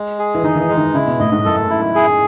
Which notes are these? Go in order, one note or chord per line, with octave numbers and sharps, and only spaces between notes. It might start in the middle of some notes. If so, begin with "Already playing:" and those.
Already playing: G#3
G#4
E3
D#3 D#4
D#3
E3
G#3
D#3
C#3 E4
B2
A2 D#5
G#2
F#2 A4
E4
G#4